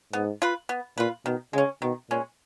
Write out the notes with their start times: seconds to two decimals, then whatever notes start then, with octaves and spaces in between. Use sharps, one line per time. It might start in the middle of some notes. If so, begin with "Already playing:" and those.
0.13 G#2 B3
0.42 F4 B4
0.69 B3
0.98 A#2 F4 B4
1.26 B2 D#3
1.53 C#3 G#3
1.58 C#4
1.82 B2 D#3
2.10 A#2 G#3 C#4